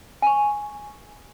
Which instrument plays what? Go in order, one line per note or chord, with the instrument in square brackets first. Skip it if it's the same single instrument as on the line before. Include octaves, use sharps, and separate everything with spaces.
[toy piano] G#5 C#6